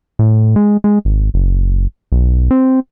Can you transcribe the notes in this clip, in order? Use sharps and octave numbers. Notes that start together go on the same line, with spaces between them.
A2
G#3
G#3
G#1
F#1
B1
C4